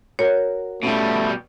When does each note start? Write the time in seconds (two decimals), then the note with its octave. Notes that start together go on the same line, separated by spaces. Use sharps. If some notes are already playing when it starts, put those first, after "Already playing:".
0.19 F#4 A#4 C#5
0.83 B2 G3 A3 C#4 F4